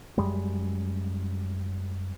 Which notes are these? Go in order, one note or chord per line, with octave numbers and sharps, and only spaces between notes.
F#2 G3 G#3